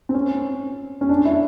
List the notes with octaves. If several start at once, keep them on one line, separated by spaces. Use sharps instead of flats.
C4
C#4
C#4
D4
E4